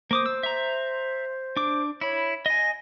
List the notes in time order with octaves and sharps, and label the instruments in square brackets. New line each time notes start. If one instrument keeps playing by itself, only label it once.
[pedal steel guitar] A#3 D6 D#6 [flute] C5
[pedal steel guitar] E6
E5 A#5
D4 D6
[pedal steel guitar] E4 B5 [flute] C#5
[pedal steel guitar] D#5 G#5 [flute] A#6